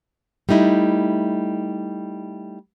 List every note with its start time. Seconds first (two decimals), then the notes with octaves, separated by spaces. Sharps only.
0.49 G3 A3 D#4 E4